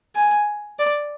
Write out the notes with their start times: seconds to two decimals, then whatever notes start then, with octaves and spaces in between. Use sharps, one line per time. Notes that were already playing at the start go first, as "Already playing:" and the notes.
0.15 G#5
0.79 D5